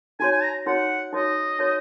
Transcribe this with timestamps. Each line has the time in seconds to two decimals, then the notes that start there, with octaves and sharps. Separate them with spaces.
0.20 D#4 F#4 C#5 G#5
0.31 G#5
0.43 A#5
0.66 D#4 F#4 C#5 F#5
1.13 D#4 F#4 C#5 D#5
1.59 D#4 F#4 C#5